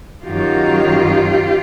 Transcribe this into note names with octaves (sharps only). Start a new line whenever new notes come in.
F#2 D#3 F#3 F4 G4